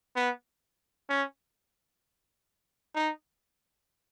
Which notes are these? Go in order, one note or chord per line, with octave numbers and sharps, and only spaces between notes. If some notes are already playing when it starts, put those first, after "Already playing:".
B3
C#4
D#4